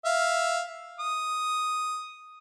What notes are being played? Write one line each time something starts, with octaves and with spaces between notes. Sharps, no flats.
E5 F5
D#6